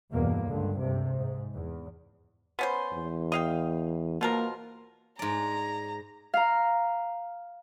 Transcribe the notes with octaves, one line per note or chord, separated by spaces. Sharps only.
E2 G2 B2 A#3
C#2 G2 D3
G2 C3
G#2
E2
B3 C#4 C5
E2
D#5 F5 G5
B2 F3 A#3 A#4
G#2 D5 A#5
F5 A#5